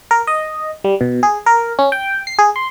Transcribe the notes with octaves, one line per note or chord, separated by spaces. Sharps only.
A#4
D#5
G3
B2
G#4
A#4
C#4
G5
C7
G#4
C6